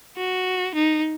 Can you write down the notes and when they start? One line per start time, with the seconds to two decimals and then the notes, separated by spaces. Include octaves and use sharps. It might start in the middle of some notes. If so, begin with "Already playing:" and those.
0.17 F#4
0.74 D#4